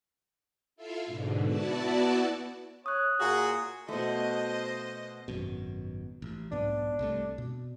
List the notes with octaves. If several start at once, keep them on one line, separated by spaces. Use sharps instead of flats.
E4 F4 A4 E5 F5
G#2 B2 D3
B3 E4 F#4 D5 A5
C#5 D#6 F#6
A#2 A#3 F#4 G#4
B2 A3 C5 D#5
G#1 F#2 B2
A1
B1 G#2 B3 D4
C2 C3 A3
B2